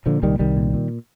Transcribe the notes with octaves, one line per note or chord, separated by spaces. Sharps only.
A#2 D3 F3
C2 D#3 G3
C2 D#3 G3
A#2
A#2